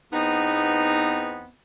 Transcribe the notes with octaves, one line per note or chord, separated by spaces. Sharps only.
E2 B3 C4 D#4